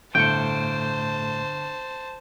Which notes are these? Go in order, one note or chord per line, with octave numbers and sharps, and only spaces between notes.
G1 A2 A3 C5 G5 A5 C#7